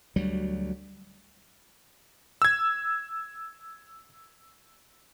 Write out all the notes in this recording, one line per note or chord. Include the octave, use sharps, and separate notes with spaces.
D2 F#3 G3
E6 G#6